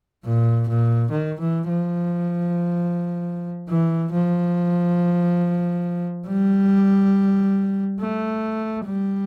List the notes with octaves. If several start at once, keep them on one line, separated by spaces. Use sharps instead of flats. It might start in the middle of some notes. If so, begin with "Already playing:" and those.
A#2
A#2
D#3
E3
F3
E3
F3
G3
A3
G3